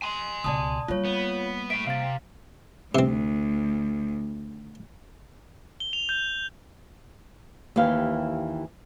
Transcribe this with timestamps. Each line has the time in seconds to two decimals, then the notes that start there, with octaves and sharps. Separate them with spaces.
0.02 G#5 C6
0.44 C#2 B2 D5 A5 D#6
0.88 G3 A#3 F4 C#5
1.05 B3
1.70 A2 E5 D7
1.87 C3 F5 A6
2.95 D2 C3 C4
5.80 G7
5.93 F7
6.09 G6
7.76 D#2 E3 G4 F5